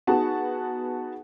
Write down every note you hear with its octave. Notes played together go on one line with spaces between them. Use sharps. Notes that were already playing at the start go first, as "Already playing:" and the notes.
B3 D#4 F#4 G#4 F#5 A5